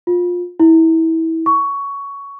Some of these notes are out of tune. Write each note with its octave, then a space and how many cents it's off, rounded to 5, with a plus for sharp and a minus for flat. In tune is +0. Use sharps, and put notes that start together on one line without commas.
F4 +20
E4 -25
C#6 +15